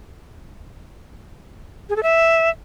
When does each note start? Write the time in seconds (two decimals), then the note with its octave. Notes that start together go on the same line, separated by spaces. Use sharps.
1.90 G#4
1.96 A4
2.03 E5